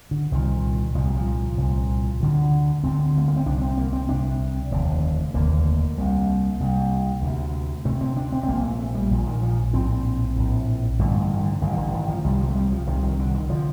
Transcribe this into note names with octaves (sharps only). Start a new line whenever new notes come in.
D3
C2 A#2 D#3
C2 A#2 F3
G3
F3
C2 A#2
D2 D3
D2 D3 C4
A3
A#3
C4
C2 C3 D4
C4
A#3
C4
C2 C3 D4
F1 D#2 D3
F1 D#2 D3 A#3
C2 C3
C2 C3
D2 C3
D2 C3 A3
C4
D4
C4
C4
A#1 A#2 A#3
A3
A3
G3
A#1 A#2
D#3
F3
A#1 A2 C4
A#1 A2
A1 G2 D3 A3
D#3
D3
A1 G2 D3 D#3
D3
D#3
F3
C2 C3 G3
F3
A3
G3
F3
C2 C3 D#3
D#3
D3
D#3
D3 F3